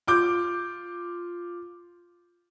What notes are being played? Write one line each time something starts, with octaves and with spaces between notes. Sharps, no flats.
F4 D6 G6